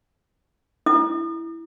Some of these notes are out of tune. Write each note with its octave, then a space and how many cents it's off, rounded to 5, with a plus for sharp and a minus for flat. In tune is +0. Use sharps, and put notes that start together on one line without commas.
E4 +0 D#6 -45